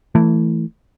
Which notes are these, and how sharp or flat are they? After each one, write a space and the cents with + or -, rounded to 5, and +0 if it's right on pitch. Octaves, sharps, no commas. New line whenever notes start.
E3 +0 A3 +15